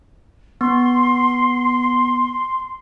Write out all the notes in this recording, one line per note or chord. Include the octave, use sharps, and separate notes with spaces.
B3 C6